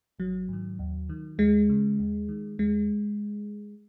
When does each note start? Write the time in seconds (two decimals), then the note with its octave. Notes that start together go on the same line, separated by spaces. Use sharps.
0.19 G#1 F#3
0.49 G#2 D#3
0.79 D#2
1.09 D#3
1.38 D#2 G#3
1.69 C#3
1.99 D#2
2.29 D#3
2.59 D#2 G#3